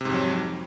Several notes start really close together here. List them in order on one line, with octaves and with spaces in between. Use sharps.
C3 G#2 F2 F#3